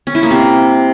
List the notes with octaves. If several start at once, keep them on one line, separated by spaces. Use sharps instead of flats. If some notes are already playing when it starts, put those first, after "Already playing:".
C#4
E4
A#3
C3